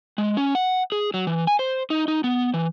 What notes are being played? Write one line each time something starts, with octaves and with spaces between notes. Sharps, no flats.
G#3
C#4
F#5
G#4
F#3
E3
G#5
C5
D#4
D#4
B3
E3